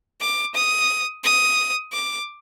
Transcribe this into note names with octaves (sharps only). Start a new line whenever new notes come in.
D6
D#6
D#6
D6